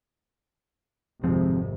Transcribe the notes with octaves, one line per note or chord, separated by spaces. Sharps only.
G#1 F2 C3 F3 C4 G#4